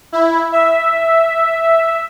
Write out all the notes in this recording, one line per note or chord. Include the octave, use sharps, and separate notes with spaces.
E4
E5